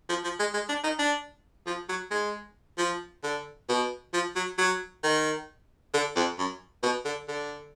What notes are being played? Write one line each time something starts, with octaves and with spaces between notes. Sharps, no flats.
F3
F3
G#3
G#3
D4
D#4
D4
F3
F#3
G#3
F3
D3
B2
F3
F#3
F#3
D#3
D3
F2
F#2
B2
D3
D3